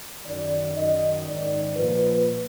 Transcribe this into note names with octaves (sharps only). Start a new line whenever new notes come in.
F#2 D#3 D5
F#2 D#3 D#5
G#2 D#3 D5
A#2 F3 B4